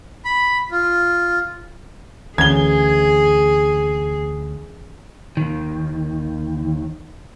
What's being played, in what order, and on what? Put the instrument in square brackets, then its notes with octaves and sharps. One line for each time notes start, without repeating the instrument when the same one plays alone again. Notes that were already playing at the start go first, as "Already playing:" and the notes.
[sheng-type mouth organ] B5
F4
[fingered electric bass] D2 [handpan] E3 C#4 [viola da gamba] G#4 [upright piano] G#6 G7
[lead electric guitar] D#2 D#3